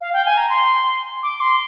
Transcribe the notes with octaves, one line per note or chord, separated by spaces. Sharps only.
F5
G5
G#5
A#5
C6
D6
C6